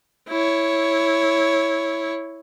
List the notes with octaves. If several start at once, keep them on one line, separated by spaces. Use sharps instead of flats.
E4 C#5